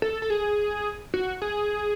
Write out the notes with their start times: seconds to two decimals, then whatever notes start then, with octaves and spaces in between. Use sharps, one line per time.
0.02 A4
0.22 A4
0.30 G#4
1.14 F#4
1.42 G#4